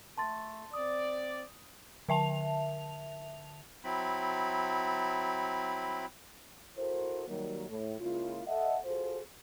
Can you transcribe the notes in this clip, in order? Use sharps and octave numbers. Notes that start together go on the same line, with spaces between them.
A3 A5 C6 A6
C4 D5 D#6
D3 E5 A5 F7
F#3 C4 E4 B5
E4 F#4 A4 A#4 C5
D#3 F#3 G3 A#3
A2
C#3 G#3 A#3 E4 F4
A4 D#5 E5 F#5
F4 F#4 G#4 A4 C5